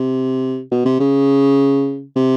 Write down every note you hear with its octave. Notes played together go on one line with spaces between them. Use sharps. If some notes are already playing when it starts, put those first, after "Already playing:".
Already playing: C3
B2
C3
C#3
C3